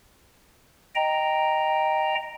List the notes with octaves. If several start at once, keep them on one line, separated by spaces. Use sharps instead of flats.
D#5 G5 A#5